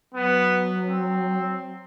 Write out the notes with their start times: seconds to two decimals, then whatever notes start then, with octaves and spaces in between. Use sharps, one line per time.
0.14 F#3 B3
0.88 C4